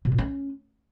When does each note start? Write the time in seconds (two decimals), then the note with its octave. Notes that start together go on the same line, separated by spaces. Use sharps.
0.05 B2
0.12 A#2
0.18 C#4